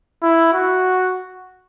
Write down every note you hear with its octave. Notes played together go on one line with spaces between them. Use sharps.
E4
F#4